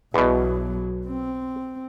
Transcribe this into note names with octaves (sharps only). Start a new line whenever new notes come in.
B1 E2 B2 F#3
C4